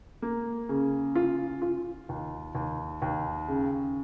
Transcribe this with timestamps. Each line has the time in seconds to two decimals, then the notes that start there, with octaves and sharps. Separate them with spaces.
0.22 A#3
0.69 C#3
1.15 F4
1.62 F4
2.09 D#2
2.55 D#2
3.02 D#2
3.48 C#3